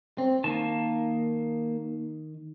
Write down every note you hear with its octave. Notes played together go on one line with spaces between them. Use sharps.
C4
D#3 A#3 A5